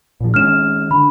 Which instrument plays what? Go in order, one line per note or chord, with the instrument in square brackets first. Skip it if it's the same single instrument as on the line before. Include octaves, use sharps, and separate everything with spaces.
[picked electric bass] A#2 F3
[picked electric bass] D#3 G#3 C#4 [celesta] F6 E7
[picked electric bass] D3 [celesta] B5